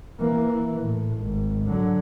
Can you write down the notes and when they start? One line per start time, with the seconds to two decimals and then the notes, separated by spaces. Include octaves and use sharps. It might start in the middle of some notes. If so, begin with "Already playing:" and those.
0.19 E3 A#3
0.48 E3
0.82 A2
1.18 G#1
1.66 D3 F#3